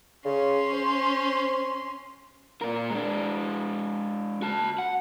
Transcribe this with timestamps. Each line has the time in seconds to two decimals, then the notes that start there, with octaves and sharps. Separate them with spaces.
0.25 C#3 C#4 C6
0.73 C5
2.61 A#2 A#4
2.90 G#3 D4
4.42 F#4 A5
4.78 F#5